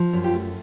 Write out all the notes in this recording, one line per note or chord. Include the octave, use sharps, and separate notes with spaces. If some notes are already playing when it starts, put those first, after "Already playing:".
Already playing: F3
F#2
F4 G4
A3